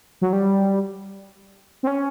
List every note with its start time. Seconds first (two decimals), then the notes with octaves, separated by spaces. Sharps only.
0.21 F#3
0.33 G3
1.83 C4
1.87 C#4